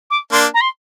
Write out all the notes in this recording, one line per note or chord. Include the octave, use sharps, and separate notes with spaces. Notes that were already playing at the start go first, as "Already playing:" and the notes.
D6
A#3 D4 C6
A#5
C6